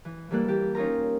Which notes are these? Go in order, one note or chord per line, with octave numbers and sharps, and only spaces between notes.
E3
E3 G3 A#3 A4 F#6
E3 G4
C#4 D#4 F4 A#4 A#5